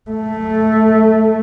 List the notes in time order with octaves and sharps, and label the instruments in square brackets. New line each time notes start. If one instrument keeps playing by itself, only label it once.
[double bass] A3